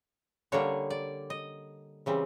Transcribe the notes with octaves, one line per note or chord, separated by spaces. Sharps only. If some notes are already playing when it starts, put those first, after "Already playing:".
D3 G3 A#3 D4 C#5
D5
D#5
C#3 E3 G3 C4